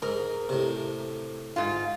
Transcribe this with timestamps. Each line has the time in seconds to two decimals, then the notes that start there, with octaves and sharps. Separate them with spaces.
0.02 G#2 A#4
0.49 A2 C3
1.56 G#2 F4